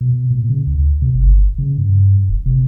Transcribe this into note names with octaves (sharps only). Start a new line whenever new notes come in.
B2
A#2
C#3
D2
C3
G1
C#3
G2
E1
C3